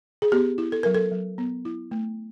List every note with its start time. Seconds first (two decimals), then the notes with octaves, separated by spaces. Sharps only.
0.22 G#4
0.32 B3 G4
0.58 E4
0.72 A4
0.83 F#3 A#4
0.94 A4
1.12 F#3
1.38 B3
1.65 E4
1.91 A3